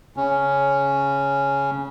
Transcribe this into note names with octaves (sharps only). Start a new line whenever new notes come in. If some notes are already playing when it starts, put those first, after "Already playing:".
C#3 C#4